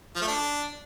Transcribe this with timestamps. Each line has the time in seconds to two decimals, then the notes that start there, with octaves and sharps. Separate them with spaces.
0.16 F3
0.22 A3
0.27 D4